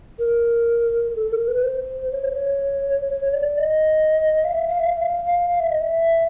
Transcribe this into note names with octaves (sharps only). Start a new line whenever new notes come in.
A#4
A4
A#4
B4
B4
C5
C#5
C5
C#5
C#5
C#5
D5
D#5
F5
E5
F5
E5
F5
E5
F5
F5
F5
E5
D#5
E5